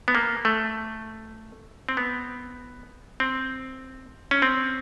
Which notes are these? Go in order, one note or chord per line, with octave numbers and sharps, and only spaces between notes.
B3
A#3
A3
C4
B3
C4
C#4
C4